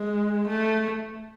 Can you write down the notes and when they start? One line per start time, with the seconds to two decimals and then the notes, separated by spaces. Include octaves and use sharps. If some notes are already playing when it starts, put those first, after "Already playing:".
Already playing: G#3
0.47 A3